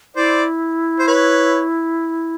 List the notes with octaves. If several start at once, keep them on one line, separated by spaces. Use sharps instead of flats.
E4 C5 D5
C5
B4 C#5